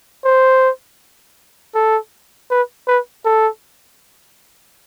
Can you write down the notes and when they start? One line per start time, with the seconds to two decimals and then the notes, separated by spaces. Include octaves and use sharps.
0.24 C5
1.75 A4
2.50 B4
2.87 B4
3.25 A4